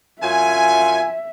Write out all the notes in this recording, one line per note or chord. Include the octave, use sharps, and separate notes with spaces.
F#2 F4 E5 G#5